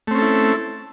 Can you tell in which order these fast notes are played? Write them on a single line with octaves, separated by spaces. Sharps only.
A3 C4 C#4 A4 E4